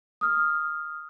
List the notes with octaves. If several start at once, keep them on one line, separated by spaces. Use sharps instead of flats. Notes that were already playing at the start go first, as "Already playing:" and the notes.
D#6 F6